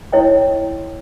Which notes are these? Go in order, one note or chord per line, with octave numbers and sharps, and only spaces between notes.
D#4 E4 C#5 D#5 G5